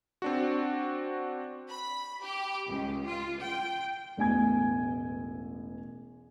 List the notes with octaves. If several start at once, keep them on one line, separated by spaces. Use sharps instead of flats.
C4 D4 F#4
B5
G4
C#2
F4
G5
E1 A1 G#5 G#6